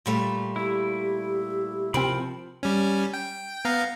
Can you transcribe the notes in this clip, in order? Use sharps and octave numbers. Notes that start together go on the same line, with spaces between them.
A#2 G3 A3
E4 G4
C3 F3 C4 A#4 G5 B5
G3 C#4
G5
B3 F5 A#5